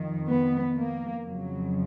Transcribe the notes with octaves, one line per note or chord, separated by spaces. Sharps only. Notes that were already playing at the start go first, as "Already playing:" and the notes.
Already playing: F2 D#3
B3
A#3
F2 C#3 F#3